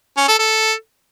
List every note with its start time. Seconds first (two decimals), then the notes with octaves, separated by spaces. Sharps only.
0.17 C#4
0.28 A4
0.39 A4